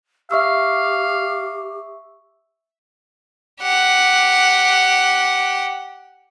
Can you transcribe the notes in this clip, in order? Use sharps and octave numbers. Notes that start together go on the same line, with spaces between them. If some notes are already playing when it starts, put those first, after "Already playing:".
G4 E5 F5 C#6 E6
G4 F#5